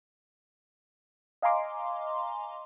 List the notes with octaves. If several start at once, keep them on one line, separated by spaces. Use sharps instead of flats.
D#5 F5 G#5 A#5 C6 D6